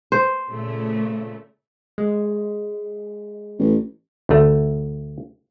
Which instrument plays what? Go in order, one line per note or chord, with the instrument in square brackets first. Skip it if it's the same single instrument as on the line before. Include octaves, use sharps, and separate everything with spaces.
[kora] C5
[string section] A#2 C#3 A3
[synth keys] G#3
[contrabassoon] A1
[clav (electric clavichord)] D2 A3